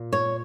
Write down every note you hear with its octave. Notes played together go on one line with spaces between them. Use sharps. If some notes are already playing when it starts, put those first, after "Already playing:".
Already playing: A#2
C#5